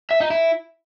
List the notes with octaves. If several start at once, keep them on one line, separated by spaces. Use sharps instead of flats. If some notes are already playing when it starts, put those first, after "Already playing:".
E5
D#4
E4